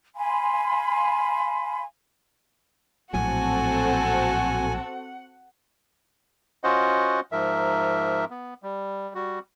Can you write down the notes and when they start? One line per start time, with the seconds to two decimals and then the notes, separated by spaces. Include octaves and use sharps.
0.15 F5 G#5 B5 C6
3.14 A#1 A2 F#3 C4 F#4 A4 F#5 G#5
6.64 C#4 F4 F#4 C5 D#5 F#5
7.32 G#2 F3 A#4 E5
8.31 B3
8.63 G3
9.15 G3 F#4